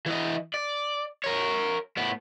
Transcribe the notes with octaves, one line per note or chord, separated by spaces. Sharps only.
E3 D#5
D5
A#4 C#5
A2 B3